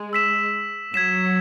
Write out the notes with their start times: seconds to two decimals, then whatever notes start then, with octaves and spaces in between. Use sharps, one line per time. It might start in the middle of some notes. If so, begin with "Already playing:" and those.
Already playing: G#3
0.13 E6 B6 E7
0.94 F#3 G#6 B6 E7